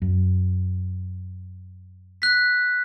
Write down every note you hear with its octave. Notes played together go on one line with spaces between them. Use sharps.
F#2
F#6 B6